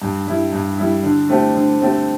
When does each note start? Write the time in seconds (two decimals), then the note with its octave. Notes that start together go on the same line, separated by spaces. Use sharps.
0.02 G2
0.27 G3 E4
0.53 G2
0.78 G3 E4
1.03 D3
1.29 A3 C4 G4
1.54 D3
1.80 A3 C4 G4